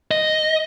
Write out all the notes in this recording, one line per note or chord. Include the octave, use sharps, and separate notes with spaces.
D#5